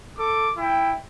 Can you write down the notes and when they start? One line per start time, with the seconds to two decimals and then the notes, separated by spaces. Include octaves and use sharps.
0.19 A4 D6
0.57 E4 G5